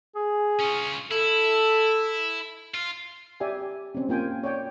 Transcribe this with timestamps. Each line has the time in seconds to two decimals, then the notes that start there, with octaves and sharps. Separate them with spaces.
0.16 G#4
0.59 C#4 F4
1.11 E4 A4
2.75 F4
3.40 G4 D5 E5 G#5
3.95 C4 C#4
4.09 A#3 F4 G5 G#5
4.43 C#5 D5 G5